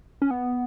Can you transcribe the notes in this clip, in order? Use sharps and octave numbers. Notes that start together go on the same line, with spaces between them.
C#4
B3